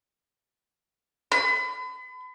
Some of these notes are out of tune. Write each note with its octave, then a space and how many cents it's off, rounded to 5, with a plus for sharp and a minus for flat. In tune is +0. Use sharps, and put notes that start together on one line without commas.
B5 +40